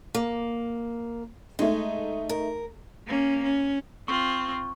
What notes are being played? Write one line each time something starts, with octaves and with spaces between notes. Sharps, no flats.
A#3
G#3 A3 D#4
A#4
A#3 C#4
C#4
C4 F4 C#6